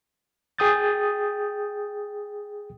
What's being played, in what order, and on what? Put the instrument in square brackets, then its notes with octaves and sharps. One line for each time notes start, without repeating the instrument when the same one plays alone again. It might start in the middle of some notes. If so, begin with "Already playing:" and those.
[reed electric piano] G#4 G5 D#6 G6 A6